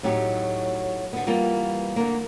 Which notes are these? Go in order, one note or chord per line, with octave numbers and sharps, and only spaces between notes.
A2 F#3 D#4 G4
D3 B3
E3 G3 A#3 B3 F4
D3 A#3